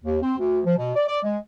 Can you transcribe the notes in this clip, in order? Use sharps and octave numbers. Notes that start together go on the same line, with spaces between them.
D#2
C4
D2
F3
B2
D5
D5
G#3